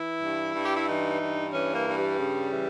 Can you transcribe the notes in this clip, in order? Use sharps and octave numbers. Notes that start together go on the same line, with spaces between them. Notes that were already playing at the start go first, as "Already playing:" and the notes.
Already playing: E3 E4
G2
G2
G4
E4
E3 D#4
G2
E3 C#4
A#3
G2
G3
C#3
E3